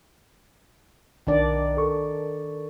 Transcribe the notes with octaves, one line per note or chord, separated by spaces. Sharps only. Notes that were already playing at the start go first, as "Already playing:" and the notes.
B1 D#3 D4 D5
A4 C#6